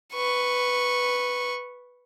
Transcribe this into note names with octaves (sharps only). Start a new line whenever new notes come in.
B4 C#6